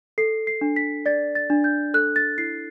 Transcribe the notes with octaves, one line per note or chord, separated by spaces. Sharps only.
A4 C7
C7
D4
B6
D5 A6
A6
D4
G6
A4 F#6
A6
E4 C7